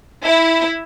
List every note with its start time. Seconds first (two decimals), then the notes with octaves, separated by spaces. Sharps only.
0.24 E4